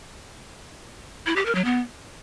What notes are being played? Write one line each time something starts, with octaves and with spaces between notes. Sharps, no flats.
E4
G4
A#4
F#3
B3